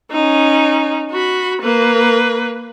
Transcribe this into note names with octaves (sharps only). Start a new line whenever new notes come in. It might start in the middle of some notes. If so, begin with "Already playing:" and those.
C#4 D#4
F#4 B5
A#3 B4